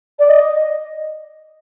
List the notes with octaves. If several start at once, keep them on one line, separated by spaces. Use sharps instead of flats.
D5
D#5